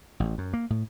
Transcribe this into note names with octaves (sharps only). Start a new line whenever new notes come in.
A1
F#2
A#3
A2